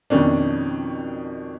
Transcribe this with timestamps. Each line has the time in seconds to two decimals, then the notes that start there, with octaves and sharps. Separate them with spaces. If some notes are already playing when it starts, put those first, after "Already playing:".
0.10 F2 B2 D#3 C#4 D4